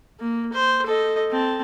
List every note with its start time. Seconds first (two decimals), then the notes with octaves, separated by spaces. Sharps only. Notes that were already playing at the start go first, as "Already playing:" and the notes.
0.20 A#3
0.53 C5
0.86 A4 D#5
1.31 C4 A5